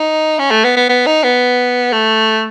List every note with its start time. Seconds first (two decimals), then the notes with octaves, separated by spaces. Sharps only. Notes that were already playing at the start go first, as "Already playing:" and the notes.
Already playing: D#4
0.39 C#4
0.51 A3
0.64 B3
0.77 B3
0.89 B3
1.06 D#4
1.23 B3
1.93 A3